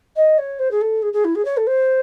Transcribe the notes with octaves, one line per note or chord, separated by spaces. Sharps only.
D#5
C#5
C5
G#4
A4
G#4
G#4
E4
G#4
C#5
A4
C5